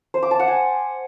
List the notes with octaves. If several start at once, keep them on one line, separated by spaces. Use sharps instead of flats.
C5
D6
A5
F#5
G#5